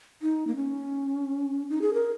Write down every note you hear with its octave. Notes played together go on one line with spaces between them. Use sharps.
D#4
A#3
C#4
D#4
G#4
A#4